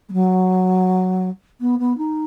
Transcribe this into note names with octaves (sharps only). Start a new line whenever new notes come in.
G#3
F#3
B3
B3
D#4